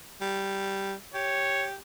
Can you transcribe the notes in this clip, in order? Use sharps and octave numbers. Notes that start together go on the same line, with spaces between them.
G3
G4 C#5